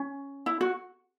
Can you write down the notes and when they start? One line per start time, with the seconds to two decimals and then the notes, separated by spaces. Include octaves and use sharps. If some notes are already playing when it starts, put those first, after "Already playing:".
Already playing: C#4
0.46 E4
0.61 F#4